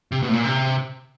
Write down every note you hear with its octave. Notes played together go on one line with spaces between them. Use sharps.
C3
B2
A2
A#2
C3